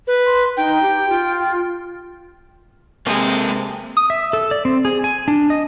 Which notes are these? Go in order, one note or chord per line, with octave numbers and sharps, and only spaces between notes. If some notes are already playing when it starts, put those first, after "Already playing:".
B4
C6
D#4 G5
G4
F4
C3 G#3 A#3 C4 A4
D#6
E5
A4
D5
C4
G#4
G#5
D4
D#5